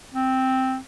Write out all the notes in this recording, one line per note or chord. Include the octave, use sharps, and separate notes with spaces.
C4